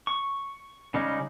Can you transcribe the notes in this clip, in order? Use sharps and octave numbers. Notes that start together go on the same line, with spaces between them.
C#6
C#3 G3 G#3 C#4 D#4